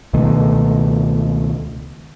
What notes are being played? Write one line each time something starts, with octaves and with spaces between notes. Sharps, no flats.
C#2 B2 D#3 A3